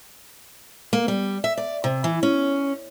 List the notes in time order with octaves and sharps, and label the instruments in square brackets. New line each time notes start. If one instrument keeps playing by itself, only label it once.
[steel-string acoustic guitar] A#3
G3
E5
D5
C3
E3
C#4